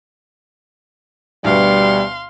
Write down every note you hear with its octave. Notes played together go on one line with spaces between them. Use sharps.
D2 B2 G3 F5 C6